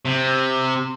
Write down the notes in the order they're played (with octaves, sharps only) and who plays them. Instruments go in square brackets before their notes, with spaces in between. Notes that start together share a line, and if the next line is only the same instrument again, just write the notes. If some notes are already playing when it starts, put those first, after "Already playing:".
[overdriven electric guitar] C3